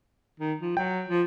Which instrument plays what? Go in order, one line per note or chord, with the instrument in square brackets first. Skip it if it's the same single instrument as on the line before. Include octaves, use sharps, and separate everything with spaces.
[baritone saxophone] D#3
F3
[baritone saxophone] F#3 [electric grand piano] G5
[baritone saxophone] F3